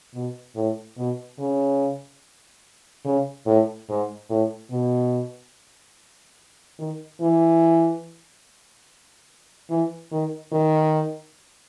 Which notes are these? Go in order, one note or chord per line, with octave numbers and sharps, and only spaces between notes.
B2
A2
B2
C#3
C#3
A2
G#2
A2
B2
D#3
E3
E3
D#3
D#3